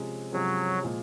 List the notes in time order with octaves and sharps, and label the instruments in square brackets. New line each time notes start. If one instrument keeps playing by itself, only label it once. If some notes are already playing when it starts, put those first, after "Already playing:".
Already playing: [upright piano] C3 F3 G#3 C#4
[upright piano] C3 F3 G#3 C#4 [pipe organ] F#3
[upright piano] A#2 F3 G#3